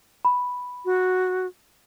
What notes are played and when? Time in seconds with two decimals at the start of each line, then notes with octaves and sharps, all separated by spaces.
0.25 B5
0.85 F#4